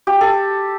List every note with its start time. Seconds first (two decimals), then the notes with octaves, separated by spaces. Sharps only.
0.07 G4
0.21 A4